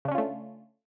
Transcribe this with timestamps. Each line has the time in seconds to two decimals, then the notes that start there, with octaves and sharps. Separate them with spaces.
0.05 C#3
0.08 D4
0.12 C#4
0.15 F4
0.18 A3